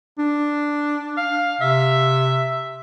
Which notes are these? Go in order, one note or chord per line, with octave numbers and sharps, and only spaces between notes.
D4
F5
C3 E5